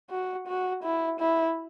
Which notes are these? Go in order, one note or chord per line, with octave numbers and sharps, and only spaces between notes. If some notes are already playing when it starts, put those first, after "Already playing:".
F#4
F#4
E4
E4